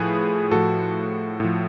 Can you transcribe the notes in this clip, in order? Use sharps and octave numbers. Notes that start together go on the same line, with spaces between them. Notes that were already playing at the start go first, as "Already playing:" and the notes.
Already playing: A2 F3 G#4 B4
A2 F3 F#4 A4
A2 F3